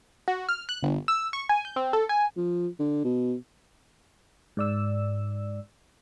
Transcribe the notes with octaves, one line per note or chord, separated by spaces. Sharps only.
F#4
F6
F#6
G1
E6
C#6
G#5
G6
C4
A4
G#5
F3
D3
B2
G#2 D5 E6